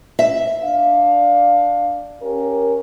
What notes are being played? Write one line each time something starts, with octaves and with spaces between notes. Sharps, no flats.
E5
D4 F5
C#4 G4 A#4